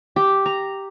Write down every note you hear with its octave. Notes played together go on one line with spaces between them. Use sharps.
G4
A#5